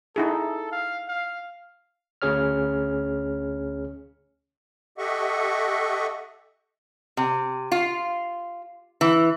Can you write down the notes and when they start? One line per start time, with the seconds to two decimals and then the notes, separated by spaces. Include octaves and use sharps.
0.16 D#4 E4 G#4 A4
0.71 F5
1.08 F5
2.22 D2 C#4 G#4 C#5 F6
4.98 G4 A4 D#5 E5 F#5 C#6
7.17 C3
7.72 F4
9.01 E3